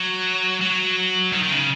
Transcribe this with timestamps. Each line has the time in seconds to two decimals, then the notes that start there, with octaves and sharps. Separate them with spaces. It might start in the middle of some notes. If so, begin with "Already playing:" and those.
Already playing: F#3
0.61 F#3
1.32 D#3
1.43 D#3
1.50 C#3